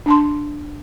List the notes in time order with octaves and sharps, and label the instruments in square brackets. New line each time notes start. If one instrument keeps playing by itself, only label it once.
[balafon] D4 A5 C6